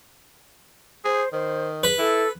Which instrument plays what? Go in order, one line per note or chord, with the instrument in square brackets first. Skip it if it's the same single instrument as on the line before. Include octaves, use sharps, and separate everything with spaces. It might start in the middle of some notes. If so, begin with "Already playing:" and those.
[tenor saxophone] G#4 [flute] C5
[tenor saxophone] D#3 [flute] C5
[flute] G#4 [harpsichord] B4
[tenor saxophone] E4 [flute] A4